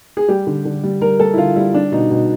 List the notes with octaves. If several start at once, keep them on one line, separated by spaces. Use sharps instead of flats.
G#4
G3 G4
D3
D3
G3
G3 A#4
G3 A4
E4
D3 F4
G3 E4
G3 D4
B2 D#4
B2